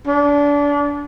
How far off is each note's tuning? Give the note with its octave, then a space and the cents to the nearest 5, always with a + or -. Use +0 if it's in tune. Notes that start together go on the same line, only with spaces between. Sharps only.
D4 -30